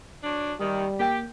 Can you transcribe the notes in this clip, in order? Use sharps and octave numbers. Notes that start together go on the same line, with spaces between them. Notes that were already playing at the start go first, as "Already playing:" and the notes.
F#3 D4
D#2 D#3 G3
A#3 G4 G5